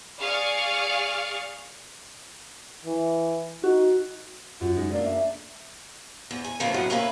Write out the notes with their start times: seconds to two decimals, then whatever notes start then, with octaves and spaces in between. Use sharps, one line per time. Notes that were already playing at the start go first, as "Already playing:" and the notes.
0.19 G#4 D5 F5 C#6 F6 A6
2.85 E3
3.64 D#4 F#4
4.61 F#2 F4
4.77 G#3 D#4
4.92 A3 A#3 D4 D5
5.05 E5
6.31 E2
6.44 G#5
6.60 C#3 E3 F3 A3 A#3 C4
6.74 F#2 A2 C#3 F#3 B3
6.90 A#3 C#4 E4 G#4 B4